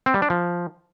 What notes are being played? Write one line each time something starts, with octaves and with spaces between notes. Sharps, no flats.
C4
G3
D4
F3